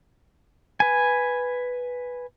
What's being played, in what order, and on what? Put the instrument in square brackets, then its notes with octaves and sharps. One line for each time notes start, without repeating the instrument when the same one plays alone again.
[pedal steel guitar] B4 G#5